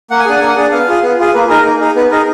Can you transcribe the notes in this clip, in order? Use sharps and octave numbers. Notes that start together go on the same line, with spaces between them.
A#3 F#5
G#5
D4 G#4 F#5
A#3 G#5
F#5
D4 G#4
B3 F5
F4 G#4
B3
F4 G#4
A#3 B4
D#4 G#4 A#4
A#3
D#4 G#4
B3 B4
D#4 G#4 A#4